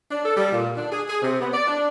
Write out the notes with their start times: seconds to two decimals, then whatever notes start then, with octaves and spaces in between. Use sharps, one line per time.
0.10 D4
0.25 A4
0.36 G3
0.52 A#2
0.77 D4
0.92 G#4
1.07 G#4
1.22 C3
1.40 B3
1.53 D5
1.67 D4